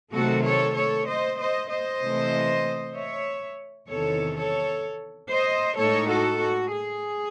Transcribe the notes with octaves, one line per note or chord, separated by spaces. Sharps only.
C3 D#3 F#3 A3 F#4 A4
A4 C#5
A4 C#5
C5 D#5
C5 D#5
C5 D#5
C3 E3 A3
C#5 E5
E2 C3 D#3 A4 C#5
A4 C#5
C5 D#5
A2 G#3 D#4 A4 C#5
F#4 A4
F#4
G#4